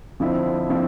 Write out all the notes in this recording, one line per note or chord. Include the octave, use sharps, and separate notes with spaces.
F2 D3 F3 C4 E4
D3 F3 C4 E4